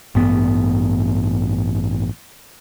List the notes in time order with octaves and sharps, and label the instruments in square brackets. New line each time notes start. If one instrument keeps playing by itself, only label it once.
[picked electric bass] A1 G2 B3